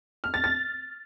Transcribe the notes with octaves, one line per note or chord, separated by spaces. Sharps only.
F6
A6
A6